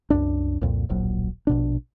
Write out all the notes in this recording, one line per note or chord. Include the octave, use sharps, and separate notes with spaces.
C2 F#2 D4
C2 F2 A#2
D1 A#1 F#3
A#1 B2 D4